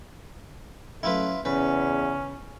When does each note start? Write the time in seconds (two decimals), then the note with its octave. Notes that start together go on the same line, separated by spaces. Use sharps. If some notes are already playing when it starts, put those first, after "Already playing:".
1.03 F#3 A3 C#4 E4 F4 B4
1.45 E2 C#3 C#4 B4